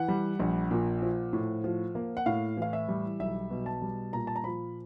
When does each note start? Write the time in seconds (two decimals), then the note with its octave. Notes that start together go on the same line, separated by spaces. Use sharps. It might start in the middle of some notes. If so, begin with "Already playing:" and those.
Already playing: E3 F#5
0.08 G3
0.40 A#1
0.71 A#2
1.02 F3
1.33 A2
1.64 F3
1.95 A#3
2.17 F#5
2.26 A2 F5
2.57 E3 F5
2.73 E5
2.89 G3
3.20 B1 E5
3.51 B2
3.66 A5
3.82 G3
4.13 A#2 A#5
4.27 A5
4.36 A#5
4.44 F3 B5